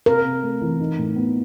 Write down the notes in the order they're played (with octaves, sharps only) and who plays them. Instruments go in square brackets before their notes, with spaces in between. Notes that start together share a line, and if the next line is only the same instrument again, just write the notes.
[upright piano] C3 [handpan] A#4
[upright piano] C3
A3
E3
D#4
A2
B3